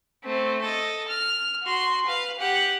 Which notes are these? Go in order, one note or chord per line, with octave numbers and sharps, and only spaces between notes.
A3 C4
A4 D#5
F6
F#4 C6
B4 F5
G4 F#5